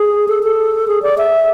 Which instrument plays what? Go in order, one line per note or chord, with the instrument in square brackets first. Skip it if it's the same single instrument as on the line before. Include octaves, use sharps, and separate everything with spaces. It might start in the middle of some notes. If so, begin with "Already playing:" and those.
Already playing: [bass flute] G#4
A4
A4
G#4
D5
E5